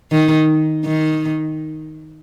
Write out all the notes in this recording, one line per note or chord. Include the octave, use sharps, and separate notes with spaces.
D#3
D#3